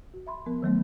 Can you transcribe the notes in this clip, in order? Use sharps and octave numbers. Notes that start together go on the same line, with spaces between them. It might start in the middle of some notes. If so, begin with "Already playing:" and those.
F#4
E5 B5 C6
F3 B3 A#4
D#3 F#3 A3 B3